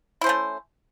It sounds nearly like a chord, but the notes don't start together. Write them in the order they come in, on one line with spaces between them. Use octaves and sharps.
E4 C5 C#4 A3